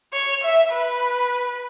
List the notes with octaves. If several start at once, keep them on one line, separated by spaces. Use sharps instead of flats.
C#5
E5
B4